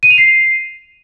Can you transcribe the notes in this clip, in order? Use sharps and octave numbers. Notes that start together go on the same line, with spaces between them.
D#7
F7
C7